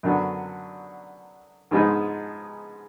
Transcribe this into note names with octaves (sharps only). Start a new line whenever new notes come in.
F#2 D3 F#3 B3
G#2 F3 G#3 B3 D#4